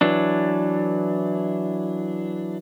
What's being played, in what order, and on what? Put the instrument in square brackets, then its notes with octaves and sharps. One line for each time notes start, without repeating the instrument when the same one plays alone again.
[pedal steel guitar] E3 F#3 D4